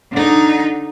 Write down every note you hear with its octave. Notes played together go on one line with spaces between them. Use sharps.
D3 D#4